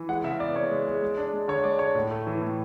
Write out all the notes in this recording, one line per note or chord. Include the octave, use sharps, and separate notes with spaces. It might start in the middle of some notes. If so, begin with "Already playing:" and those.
Already playing: E3
G#3 F#5
C#3 E5
B3 D5
C#3 C#5
G#3
G#3
G#3
D4
G#3
D3 C#5
G#3 D5
D3 C#5
A2
A3
E3
A2